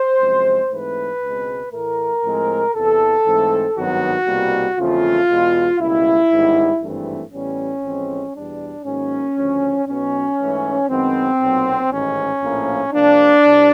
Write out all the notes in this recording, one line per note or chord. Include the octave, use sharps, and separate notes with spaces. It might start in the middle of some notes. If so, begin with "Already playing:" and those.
Already playing: C5
F#2 C#3 F3 G#3 C4
G#2 E3 A3 C4 B4
C#2 B2 G#3 C4
A2 E3 A3 A#4
A2 F3 G#3 C4
E2 C3 E3 A4
G#2 E3 A3 C4
G#1 G2 D#3 F#3 B3 F#4
C2 B2 G3 A#3
E2 C#3 F3 A3 C4 F4
E2 B2 G#3
C#2 B2 G3 A#3 E4
A1 G#2 D#3 G3 B3
G#1 G2 E3 A3 C4
A1 A2 E3 G3 B3 C#4
A1 A2 F3 G#3 C4
E2 B2 G3 D4
G#2 D#3 F#3 A#3 C#4
D2 C#3 F3
B1 B2 F#3 B3 C#4
G#2 E3 A3
F#2 D#3 G#3 B3 C4
B1 A#2 F#3
A1 G#2 D#3 C#4
A#1 A2 F3 A#3
C2 C3 F3 A#3 D4
C2 C3